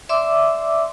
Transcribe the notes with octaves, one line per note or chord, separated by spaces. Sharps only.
D5 E5 C6 D6 E6